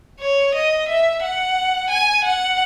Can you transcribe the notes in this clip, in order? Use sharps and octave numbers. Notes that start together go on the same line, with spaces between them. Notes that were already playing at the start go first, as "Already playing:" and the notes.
C#5
D#5
E5
F#5
G#5
F#5